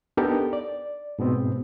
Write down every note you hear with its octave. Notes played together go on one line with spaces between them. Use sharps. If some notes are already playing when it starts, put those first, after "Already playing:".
B3 D4 D#4 G4 A4 A#4
D5
G#2 B2 B3 C4